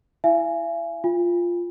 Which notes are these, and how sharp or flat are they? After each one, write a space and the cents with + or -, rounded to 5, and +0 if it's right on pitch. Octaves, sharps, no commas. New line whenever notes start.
E4 +5 E5 +45 G#5 +0
F4 +0 G#5 -40